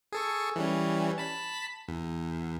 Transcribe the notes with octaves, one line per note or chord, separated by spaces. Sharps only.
G#4 A4 C#6
E3 G3 C#4
A5 B5 B6
E2